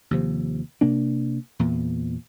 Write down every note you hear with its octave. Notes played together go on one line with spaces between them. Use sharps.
D#2 C3 F3
C3 A#3 D4
E2 A#2